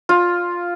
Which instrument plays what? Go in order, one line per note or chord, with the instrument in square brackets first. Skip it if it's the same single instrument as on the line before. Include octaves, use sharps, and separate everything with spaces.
[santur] F4